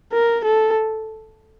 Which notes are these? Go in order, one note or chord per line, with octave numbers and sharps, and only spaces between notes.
A#4
A4